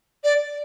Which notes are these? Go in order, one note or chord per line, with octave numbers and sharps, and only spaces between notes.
D5